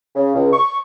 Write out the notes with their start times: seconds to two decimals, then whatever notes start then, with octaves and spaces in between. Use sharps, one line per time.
0.16 C#3
0.35 C#2
0.53 C#6